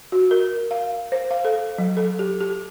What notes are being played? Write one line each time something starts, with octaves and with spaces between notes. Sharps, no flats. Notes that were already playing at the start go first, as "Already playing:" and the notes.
F#4
A#4
F5
C5
F5
A4
F#3
A4
G4
G4